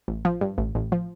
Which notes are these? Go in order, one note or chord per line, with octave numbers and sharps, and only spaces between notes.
A1
F3
G2
A1
A1
F3